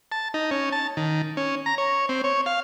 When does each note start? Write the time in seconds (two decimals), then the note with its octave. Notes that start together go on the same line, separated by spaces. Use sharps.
0.12 A5
0.34 D#4
0.51 C#4
0.72 A5
0.97 D#3
1.37 C#4
1.66 A#5
1.78 C#5
2.09 C4
2.24 C#5
2.46 F5